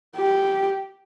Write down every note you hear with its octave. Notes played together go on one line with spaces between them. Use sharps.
G4